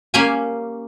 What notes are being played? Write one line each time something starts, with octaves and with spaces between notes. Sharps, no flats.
A#3 C#4 G4 F5 G#5